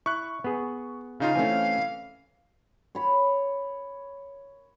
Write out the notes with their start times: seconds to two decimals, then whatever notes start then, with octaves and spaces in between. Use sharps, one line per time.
0.06 E4 C#6 F#6
0.44 B3 G#4
1.20 C#3 D#4 F4 F5
1.35 E3 A3 C4 C#4 G#5
2.95 C#5 B5